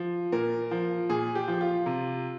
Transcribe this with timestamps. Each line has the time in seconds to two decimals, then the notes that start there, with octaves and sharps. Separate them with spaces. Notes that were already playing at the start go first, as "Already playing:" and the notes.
Already playing: F3
0.32 A#2 A#4
0.71 F3
1.09 A#2 G#4
1.35 G4
1.48 F3
1.61 F4
1.86 C3